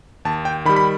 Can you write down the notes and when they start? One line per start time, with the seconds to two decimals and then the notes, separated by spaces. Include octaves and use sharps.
0.25 D#2 A5
0.45 G5
0.65 D#3 B5
0.69 G3
0.76 B5